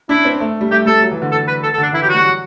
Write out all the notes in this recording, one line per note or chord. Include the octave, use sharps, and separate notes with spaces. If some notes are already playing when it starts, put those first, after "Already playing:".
D4 E4
C4
A3
G3
A3 G4
G3 A4
F#3
E3
D3
A4
B4
A4
A4
D3
D4
E3 E4
F#3 G4
F#4
G3
F#3